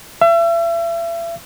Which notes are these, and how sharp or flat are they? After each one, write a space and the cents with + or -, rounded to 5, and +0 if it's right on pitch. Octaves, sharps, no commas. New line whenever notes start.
E5 +40